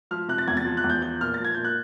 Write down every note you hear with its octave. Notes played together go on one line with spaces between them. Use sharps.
F3 F6
C3 F#6
A6
E2 G#6
A6
F3
F#6
E2
G6
F3 G6
A#2 F6
F3 A6
G#6
A#2 G6
F#6